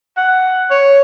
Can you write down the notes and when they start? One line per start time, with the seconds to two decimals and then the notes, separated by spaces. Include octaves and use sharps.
0.17 F#5
0.70 C#5